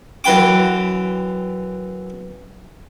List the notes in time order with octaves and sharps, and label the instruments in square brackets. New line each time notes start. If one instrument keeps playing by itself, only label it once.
[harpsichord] F#2 E3 B4 G5 D6